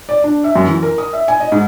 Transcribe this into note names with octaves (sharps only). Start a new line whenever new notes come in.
D5
D4
E5
F#2
E3
A#4
D#6
E5
G#5
D#5
G#2